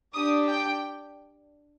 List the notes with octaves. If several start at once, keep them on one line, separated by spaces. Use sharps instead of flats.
D4 G4 D#6
G5